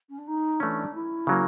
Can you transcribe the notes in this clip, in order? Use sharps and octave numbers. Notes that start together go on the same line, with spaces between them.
C#4
D4
D#4
E3 A3 C#4 D4
E4
C#3 F#3 A#3